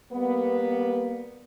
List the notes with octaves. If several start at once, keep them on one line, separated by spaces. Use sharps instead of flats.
G3 A#3 B3